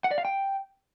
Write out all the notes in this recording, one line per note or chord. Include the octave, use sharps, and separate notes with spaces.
F#5
D5
F5
G5